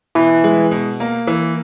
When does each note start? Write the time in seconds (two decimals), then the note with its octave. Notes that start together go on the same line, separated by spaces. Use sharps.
0.15 B2 E3
0.44 G#3
0.71 B2
1.00 A#3
1.27 E3